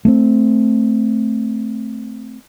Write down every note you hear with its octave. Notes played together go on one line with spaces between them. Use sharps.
A3 B3 C4